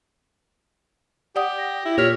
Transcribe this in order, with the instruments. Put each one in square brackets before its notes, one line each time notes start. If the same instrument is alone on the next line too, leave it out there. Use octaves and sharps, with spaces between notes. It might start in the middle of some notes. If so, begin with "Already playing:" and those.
[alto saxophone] G4 [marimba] D5 F#5 D#6
[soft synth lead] A#6
[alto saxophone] E4
[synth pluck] A#2 F6 B6 [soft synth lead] G4 [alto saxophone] C#5